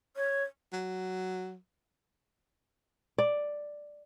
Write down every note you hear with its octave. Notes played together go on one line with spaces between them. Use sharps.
C#5
F#3
D5